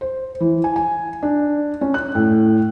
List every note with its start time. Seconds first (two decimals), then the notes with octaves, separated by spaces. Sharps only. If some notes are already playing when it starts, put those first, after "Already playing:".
0.01 C5
0.40 E3
0.64 G#5
0.76 G#5
1.23 D4
1.81 C#4
1.94 F#6
2.15 A2